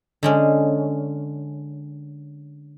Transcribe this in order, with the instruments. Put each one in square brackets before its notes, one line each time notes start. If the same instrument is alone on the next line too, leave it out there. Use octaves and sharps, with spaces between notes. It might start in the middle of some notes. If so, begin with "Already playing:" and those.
[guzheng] D3 G#3 C#4